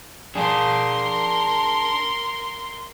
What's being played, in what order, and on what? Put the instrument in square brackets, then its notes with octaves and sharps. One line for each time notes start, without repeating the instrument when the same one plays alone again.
[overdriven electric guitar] D4 G#4 [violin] A#4 C6